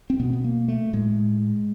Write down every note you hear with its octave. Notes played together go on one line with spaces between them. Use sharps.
C4
B2 B3
B3
A#3
A3
A2 G#3